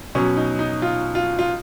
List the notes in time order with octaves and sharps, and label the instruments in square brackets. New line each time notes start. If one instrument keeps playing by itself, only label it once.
[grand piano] B2 F#3 C#4
D#4
D#4
F4
F4
F4